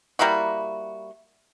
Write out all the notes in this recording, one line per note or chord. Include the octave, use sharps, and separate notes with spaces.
G3 A#3 E4 F#4